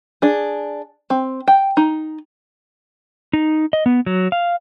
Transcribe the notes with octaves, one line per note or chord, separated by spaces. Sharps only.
D4 G#4
C4
G5
D#4
D#4
D#5
B3
F#3
F5